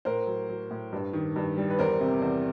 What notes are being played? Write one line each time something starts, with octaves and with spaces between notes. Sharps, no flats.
A2 A#4 C5
F#3
F#3
A2
G2
D#3
G2
G3
B4
E2 A#4 C5
C3
E2